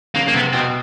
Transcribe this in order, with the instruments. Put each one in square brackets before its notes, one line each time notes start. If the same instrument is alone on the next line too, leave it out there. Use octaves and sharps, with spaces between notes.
[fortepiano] C#3 [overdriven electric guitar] A#3
[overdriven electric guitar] A#3
[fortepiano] C3 [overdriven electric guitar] B3
[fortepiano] B2 [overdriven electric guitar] C4